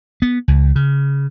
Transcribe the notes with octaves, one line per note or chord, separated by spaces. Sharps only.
B3
C#2
C#3